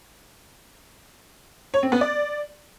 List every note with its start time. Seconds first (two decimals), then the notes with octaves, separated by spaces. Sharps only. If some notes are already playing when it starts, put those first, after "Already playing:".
1.74 C#5
1.83 C4
1.92 B3
2.01 D5